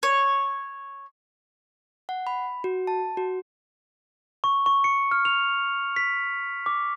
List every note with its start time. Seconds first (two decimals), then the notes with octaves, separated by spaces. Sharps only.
0.03 C#5
2.09 F#5
2.27 B5
2.64 F#4
2.87 A5
3.17 F#4
4.44 C#6
4.66 C#6
4.84 C#7
5.11 F6
5.25 F7
5.96 B6
6.66 D6